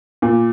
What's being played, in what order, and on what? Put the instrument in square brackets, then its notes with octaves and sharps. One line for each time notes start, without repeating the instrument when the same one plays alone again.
[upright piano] A#2